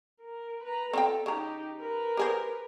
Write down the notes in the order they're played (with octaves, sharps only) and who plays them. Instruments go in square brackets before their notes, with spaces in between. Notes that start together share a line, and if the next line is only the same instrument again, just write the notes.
[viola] A#4
B4 A#5
[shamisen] C4 F4 G5 [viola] A4
[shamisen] C#3 A#5 [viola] D#4 G4
[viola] A#4 B4
[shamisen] G4 G#4 C5